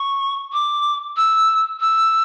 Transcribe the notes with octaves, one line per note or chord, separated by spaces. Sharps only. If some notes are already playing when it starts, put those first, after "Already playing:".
Already playing: C#6
D6
E6
E6